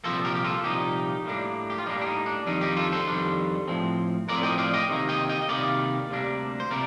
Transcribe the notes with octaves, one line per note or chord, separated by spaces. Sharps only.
C2 A#2 F3 A#3 A4 C5
G4 A#4
G4
F4 A4
C2 A#2 F3 A#3 D#4 G4
A2 G3 A#3 D4
G4
F4
A2 G3 A#3 D4 D#4
D4
D#4
D4
F2 D#3 G3 D4 D#4
D#4 G4
F4 A4
A4 C5
F2 D#3 G3 D4
A2 F3 C4
A2 F3 C4 A#4 D5
D#5 G5
D5 F5
D#5 G5
C3 D#3 G3 A#3
D#5 G5
D#5 G5
D#5
C3 D#3 G3 A#3 D5 F5
D2 C3 G3 A#3 D4
C5
C3 G3 A#3 A#4 D5